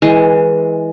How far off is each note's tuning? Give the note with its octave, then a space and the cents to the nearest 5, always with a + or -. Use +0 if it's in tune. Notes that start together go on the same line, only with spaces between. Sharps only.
E3 -15 G#3 +0